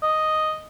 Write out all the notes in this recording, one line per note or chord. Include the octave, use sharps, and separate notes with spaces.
D#5